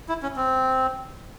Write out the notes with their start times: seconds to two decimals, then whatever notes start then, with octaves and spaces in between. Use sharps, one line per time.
0.09 E4
0.23 C#4
0.36 C4